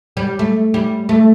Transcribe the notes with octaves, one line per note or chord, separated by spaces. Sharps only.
G3
A3
G3
A3